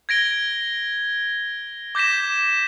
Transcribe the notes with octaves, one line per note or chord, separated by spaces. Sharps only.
G#6 A#6 D7 G7
D6 G6 A#6 B6 E7